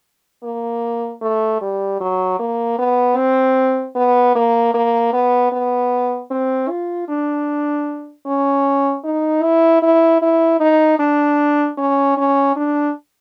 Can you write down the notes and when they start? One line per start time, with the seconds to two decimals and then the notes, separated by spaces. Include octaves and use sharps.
0.44 A#3
1.21 A3
1.61 G3
2.01 F#3
2.39 A#3
2.78 B3
3.17 C4
3.95 B3
4.35 A#3
4.74 A#3
5.13 B3
5.52 B3
6.31 C4
6.69 F4
7.08 D4
8.26 C#4
9.04 D#4
9.43 E4
9.82 E4
10.22 E4
10.60 D#4
10.99 D4
11.77 C#4
12.17 C#4
12.56 D4